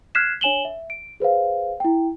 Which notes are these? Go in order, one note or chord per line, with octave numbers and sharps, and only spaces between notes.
F6 F#6 G#6 B6 C7 E7
D4 C#5 G#5 E7 F#7 G7
E5
D7
G#4 B4 C5 F5
E4 G5